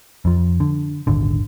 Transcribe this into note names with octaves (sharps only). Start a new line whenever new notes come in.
F2 F3
D3
D#1 G#1 D3